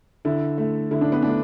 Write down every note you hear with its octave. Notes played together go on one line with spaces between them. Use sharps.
D3 E4
A3
D3 E4
D4
B3
A3 D4